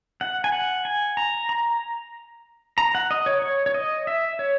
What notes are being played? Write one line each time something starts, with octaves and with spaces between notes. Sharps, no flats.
F#5
G#5
F#5
G#5
A#5
A#5
A#5
F#5
D#5
C#5
C#5
C#5
D#5
E5
C#5